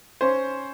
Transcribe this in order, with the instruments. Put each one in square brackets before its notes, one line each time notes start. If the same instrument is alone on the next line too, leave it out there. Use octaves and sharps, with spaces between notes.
[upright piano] C#4 C5